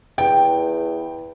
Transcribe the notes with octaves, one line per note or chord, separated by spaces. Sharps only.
E2 G5